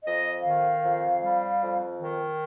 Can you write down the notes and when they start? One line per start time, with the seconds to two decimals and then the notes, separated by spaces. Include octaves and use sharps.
0.05 F2 D#5
0.44 D#3 F5
0.83 F2
1.22 G3
1.61 F2
1.99 D#3